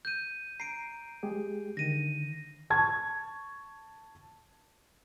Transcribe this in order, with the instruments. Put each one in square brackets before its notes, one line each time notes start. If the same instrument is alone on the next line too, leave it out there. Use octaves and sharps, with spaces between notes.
[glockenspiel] G6 D#7
[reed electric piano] A#5 [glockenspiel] C7 D7
[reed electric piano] G#3 G4 G#4
[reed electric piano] D3 D#3 [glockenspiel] A#6 D#7
[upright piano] A5 C#6 G#6